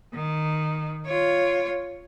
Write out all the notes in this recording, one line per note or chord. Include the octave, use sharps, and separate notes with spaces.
D#3
F4 C#5